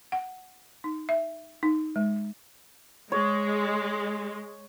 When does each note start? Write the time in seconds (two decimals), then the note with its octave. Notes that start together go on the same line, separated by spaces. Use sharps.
0.12 F#5
0.84 D#4
1.09 E5
1.63 D#4
1.96 G#3
3.12 G#3 C#5